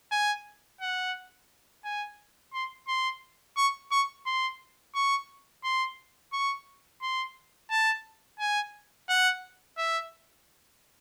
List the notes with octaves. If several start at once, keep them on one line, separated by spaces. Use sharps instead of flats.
G#5
F#5
G#5
C6
C6
C#6
C#6
C6
C#6
C6
C#6
C6
A5
G#5
F#5
E5